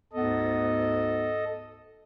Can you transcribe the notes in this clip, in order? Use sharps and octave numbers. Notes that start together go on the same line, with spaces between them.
D2 G#2 B3 A4 D#5